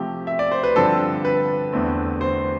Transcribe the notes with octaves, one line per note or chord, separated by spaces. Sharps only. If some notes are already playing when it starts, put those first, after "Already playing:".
Already playing: C3 F3 A3 C4 G4
E5
D5
C5
B4
G2 D3 F3 C4 A4
B4
E2 D3 A3 C4
C5